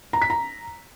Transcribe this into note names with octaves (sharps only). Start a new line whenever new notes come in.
A#5
B6
A#5